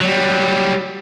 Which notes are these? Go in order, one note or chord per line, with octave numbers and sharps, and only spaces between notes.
F#3 G3